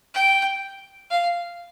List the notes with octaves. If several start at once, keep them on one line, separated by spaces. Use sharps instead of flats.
G5
F5